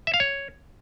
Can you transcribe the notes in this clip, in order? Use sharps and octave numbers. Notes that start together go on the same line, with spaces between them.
E5
F5
C#5